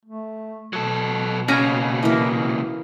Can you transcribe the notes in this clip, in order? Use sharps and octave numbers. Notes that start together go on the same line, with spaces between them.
A3
B2 F#3 A4
A#2 C#3 C#4 C#5 G#5 A#5
E3 A#3